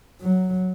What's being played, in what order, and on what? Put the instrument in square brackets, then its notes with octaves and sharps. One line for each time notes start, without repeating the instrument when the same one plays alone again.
[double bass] F#3